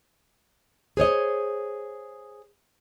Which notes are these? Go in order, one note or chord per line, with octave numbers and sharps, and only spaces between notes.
G#4 C5 C#5 D#5